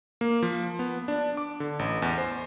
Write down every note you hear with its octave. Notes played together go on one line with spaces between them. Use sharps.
A#3
F3
B3
D4
D6
D3
A1
E2
C5